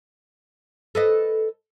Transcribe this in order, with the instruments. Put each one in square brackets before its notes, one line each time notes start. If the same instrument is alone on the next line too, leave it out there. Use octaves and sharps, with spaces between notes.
[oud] A4 B4 D#5